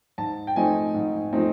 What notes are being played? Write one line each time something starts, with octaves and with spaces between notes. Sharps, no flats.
G#2 A5
G5
F3 A3 C4 D#4 G#5
G#2
F3 A3 C4 D#4